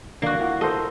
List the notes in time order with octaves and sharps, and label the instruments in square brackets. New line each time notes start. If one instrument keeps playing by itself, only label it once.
[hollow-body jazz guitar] D3 D#3 D5 [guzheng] A#3 F#4
[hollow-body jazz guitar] E4 F4 F#5
[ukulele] A4 A#4 C5 [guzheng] D#5